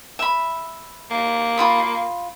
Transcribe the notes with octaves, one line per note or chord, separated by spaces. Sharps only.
E5 B5
A#3
F4 B5 D#6